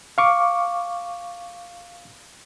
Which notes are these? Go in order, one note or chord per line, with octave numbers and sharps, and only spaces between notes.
F5 C#6 D6